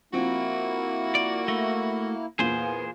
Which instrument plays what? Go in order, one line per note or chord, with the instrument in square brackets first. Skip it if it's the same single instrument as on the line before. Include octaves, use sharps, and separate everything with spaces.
[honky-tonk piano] F3 C4 [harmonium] A#3 E4 [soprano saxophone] F#4
[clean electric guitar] D5
[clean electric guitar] A3 [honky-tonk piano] A#6
[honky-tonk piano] E2 A#2 [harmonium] B3 F4 [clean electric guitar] G#4 C5